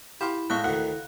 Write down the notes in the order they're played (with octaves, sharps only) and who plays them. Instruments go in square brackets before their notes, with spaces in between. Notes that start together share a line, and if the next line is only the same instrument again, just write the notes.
[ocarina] E4 [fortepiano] G4 F5 C6 [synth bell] B5
[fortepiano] A2 G#3 C#6 [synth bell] F5 F#6
[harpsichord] D2 D#3 [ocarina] E4 [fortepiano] F#5